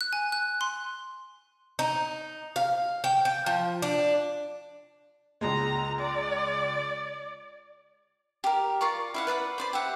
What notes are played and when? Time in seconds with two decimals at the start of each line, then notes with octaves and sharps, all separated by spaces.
0.01 F#6
0.13 G#5
0.32 F#6
0.61 C6
1.79 D#4
2.56 F5
3.04 G5
3.25 G5
3.46 F3
3.82 D4
5.41 C#2 G#3 A#5
5.98 D5
8.44 G4 A#4
8.81 F4 A#4 D5 C#6
9.14 E4 F5 F#5
9.27 B4 D5 F5 F#5
9.58 C5 D5 B5
9.73 G4 E5 F#5